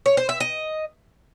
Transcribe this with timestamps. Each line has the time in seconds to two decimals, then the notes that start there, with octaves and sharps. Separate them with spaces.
0.06 C#5
0.17 C5
0.29 E5
0.40 D#5